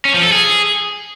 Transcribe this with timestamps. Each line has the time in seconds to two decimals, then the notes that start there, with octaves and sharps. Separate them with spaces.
0.05 C#4
0.14 F3
0.23 A4
0.32 G#4